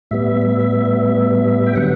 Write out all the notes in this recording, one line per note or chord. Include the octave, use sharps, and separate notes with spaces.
A2 G3 B3 E5
G5
D3 F#3 B3 F#5